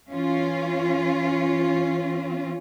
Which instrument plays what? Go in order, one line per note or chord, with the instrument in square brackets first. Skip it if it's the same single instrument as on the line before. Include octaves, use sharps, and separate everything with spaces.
[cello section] E3 C#4 F4